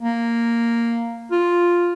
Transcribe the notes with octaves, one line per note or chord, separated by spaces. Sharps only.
A#3
F4